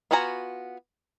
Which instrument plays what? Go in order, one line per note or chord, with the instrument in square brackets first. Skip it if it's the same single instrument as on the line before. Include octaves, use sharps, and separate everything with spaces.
[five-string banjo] B3 F4 F#4 G#5 A#5